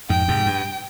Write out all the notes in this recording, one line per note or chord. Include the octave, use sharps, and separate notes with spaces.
F2 G#2 G5
G#2 C3
G2